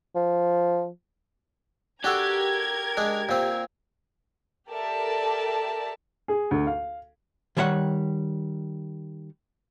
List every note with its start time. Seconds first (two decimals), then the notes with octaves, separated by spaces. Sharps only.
0.15 F3
2.04 D4 F#4 G4 A4 A#4 G#6
2.97 G#3 D4
3.29 A#2 C4
4.69 G4 A4 A#4 D5 E5 A5
6.28 G#4
6.51 D2
6.67 F5
7.57 D#3 G3 C#5 E5 F#5